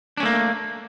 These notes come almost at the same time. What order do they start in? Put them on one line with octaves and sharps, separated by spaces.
D4 C#4 A3 A#3